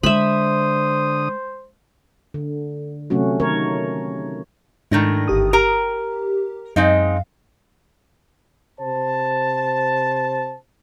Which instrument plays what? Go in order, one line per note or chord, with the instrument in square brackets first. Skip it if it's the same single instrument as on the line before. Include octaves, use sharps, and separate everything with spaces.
[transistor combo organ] D3 D#6 [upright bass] G#3 [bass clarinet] C5 [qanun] E5 B5
[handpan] D3
C3 F#3 A3 C#4 F#4
D#3 A#4 C#5
[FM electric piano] G#2 D4 A#6 [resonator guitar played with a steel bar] D#3 A3 E4
[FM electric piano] G1 G4 D#6
[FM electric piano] G4 [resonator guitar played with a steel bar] A#4 A#5
[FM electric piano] F#2 F5 [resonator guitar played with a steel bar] G#3 C4 D#4
[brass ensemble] C3 C5 A5